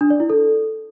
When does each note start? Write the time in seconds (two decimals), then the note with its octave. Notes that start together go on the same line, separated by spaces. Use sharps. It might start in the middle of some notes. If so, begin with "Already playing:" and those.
0.01 D4
0.10 D5
0.20 E4
0.30 A4